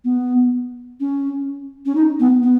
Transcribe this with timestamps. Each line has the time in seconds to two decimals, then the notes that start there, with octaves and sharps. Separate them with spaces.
0.05 B3
1.00 C#4
1.86 C#4
1.95 D#4
2.20 B3
2.43 B3